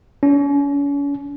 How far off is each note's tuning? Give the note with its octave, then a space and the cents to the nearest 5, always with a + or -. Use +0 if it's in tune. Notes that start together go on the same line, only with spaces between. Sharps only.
C#4 +40